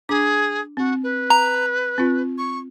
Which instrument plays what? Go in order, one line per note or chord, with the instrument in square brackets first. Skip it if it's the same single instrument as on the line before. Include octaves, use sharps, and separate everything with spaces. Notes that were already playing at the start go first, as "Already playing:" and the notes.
[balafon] D4 D6 [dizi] G#4
[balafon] C4 [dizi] F#4
[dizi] B4
[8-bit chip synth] A#5
[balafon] C4 F4
[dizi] C#6